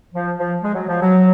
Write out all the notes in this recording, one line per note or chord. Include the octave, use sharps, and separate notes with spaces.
F3
F3
G#3
F#3
F3
F#3